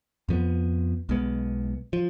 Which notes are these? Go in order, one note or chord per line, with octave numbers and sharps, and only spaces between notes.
F2 F3 G#3 B3
B1 B2 G#3 B3
F3